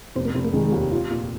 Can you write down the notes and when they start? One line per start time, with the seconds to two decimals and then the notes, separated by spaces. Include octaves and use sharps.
0.16 F1 C4
0.25 A#3
0.34 F1 C4
0.45 A#3
0.53 D#3 G#3
0.72 D#2
0.91 F4
1.11 A#2